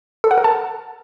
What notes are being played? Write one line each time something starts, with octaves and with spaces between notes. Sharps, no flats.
A4
F#5
A#4
A5